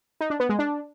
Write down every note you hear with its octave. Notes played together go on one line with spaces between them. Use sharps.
D#4
D4
B3
G#3
D4